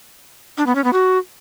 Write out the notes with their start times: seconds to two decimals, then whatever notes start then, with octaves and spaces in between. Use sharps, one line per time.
0.58 D4
0.66 B3
0.75 C#4
0.84 B3
0.93 F#4